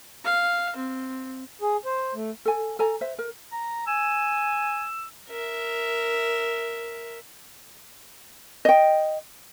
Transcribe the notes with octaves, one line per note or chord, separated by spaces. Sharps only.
F5
C4
G#4
C5
A3
A4 G#5
A4 G#5 A#5
B4 C5 E5
A#4
A#5
G#5 E6
A#4 E5
D#5 G5